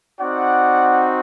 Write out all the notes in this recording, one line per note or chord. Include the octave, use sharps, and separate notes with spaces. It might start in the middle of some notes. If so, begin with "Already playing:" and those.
C4 D#4 F#4 D5 F#5